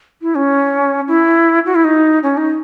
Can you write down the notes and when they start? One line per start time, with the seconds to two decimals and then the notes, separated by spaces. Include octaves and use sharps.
0.22 E4
0.36 C#4
1.08 E4
1.66 F#4
1.75 E4
1.84 D#4
2.23 C#4
2.37 D#4